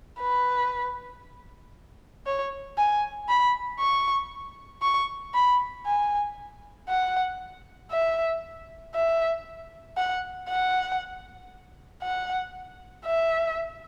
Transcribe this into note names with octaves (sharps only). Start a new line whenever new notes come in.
B4
C#5
G#5
B5
C#6
C#6
B5
G#5
F#5
E5
E5
F#5
F#5
F#5
E5